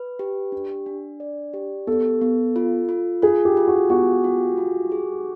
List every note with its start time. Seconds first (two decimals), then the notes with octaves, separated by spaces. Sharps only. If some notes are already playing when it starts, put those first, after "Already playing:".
Already playing: B4
0.19 G4
0.52 D4
0.86 D4
1.20 D5
1.54 G4
1.87 B3 A4
2.22 B3
2.56 F4
2.89 F4
3.22 F4 G#4
3.45 G4
3.57 F4
3.68 F#4
3.90 B3 F#4
4.24 F4
4.58 F4
4.92 G#4